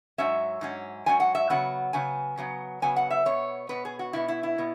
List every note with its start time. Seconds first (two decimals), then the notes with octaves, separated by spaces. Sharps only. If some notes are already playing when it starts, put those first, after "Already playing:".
0.18 G#2 F#3 C#4 E5
0.61 G#2 F#3 C#4
1.06 G#2 F#3 C#4 G#5
1.20 F#5
1.35 E5
1.50 C#3 F#3 B3 F#5
1.93 C#3 F#3 B3 G#5
2.37 C#3 F#3 B3
2.82 C#3 F#3 B3 G#5
2.96 F#5
3.10 E5
3.25 B2 B3 C#5
3.69 B2 B3 B4
3.85 G#4
3.99 F#4
4.13 B2 B3 E4
4.28 E4
4.43 E4
4.58 B2 B3